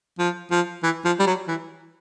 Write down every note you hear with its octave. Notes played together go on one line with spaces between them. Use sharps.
F3
F3
E3
F3
G3
F#3
E3